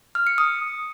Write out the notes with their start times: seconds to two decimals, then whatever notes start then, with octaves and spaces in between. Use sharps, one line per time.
0.15 F6
0.27 C#7
0.38 D#6